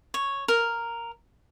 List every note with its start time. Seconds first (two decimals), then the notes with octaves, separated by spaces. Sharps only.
0.14 C#5
0.48 A#4